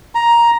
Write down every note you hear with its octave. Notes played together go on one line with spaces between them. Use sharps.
A#5